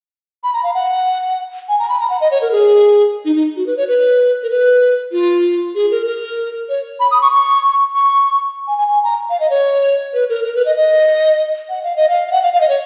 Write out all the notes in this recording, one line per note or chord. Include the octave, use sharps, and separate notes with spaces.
B5
A#5
F5
F#5
G#5
A#5
B5
A#5
F#5
D#5
C#5
A#4
G#4
D#4
D#4
F#4
B4
C#5
B4
A#4
B4
F4
G#4
A#4
A#4
C#5
B5
D#6
C#6
C#6
C#6
G#5
G#5
G#5
A#5
F5
D#5
C#5
B4
A#4
A#4
B4
D#5
D#5
F#5
F5
D#5
F5
F5
F#5
F5
F5
D#5
C#5